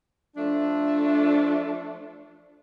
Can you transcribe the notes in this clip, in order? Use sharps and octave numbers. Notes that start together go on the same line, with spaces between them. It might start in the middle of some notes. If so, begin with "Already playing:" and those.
F3 A3 D4